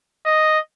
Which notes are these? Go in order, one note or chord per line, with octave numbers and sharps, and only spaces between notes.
D#5